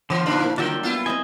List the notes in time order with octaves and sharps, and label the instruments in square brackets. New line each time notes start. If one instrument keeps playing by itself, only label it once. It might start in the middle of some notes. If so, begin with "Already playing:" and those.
[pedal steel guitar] D3 B3 F4 [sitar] E3
[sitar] A#2 F3 D4 [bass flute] D#4 [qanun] B5
[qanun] A#3 E4
[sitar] D3 [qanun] F#3 G3 G4 [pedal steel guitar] D4 E5 G5 [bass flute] F4
[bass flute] B3 [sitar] E4 F4
[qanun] C4 C5 E5 [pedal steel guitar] D#5 G#5